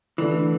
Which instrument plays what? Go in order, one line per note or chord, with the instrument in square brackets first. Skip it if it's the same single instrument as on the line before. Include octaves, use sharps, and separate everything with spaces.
[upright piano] D3 A3 D4 [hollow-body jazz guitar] E3